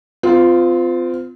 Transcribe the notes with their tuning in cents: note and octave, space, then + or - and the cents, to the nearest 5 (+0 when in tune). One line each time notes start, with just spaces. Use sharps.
C4 -35 F4 +0